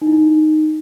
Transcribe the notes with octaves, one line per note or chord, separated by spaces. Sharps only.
D#4
E4
D#4